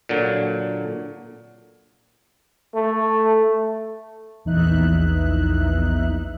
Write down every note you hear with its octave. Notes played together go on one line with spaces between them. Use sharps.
A#2 D3 F#3
A3
A#1 E2 E3 D#4 E5 F#6